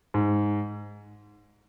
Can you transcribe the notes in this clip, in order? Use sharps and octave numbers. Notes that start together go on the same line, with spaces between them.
G#2